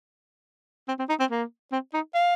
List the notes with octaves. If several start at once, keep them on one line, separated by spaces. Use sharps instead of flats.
C4
C4
D#4
C4
A#3
C4
D#4
F5